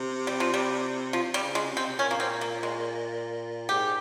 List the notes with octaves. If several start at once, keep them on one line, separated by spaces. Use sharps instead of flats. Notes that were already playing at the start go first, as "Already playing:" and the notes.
Already playing: C3
G3
F3
G3
C3 F3
G3
C#3
G#3
C3
C4
C3
A#2 C#4
A#3
C4
A#3
G#3
G#2 G4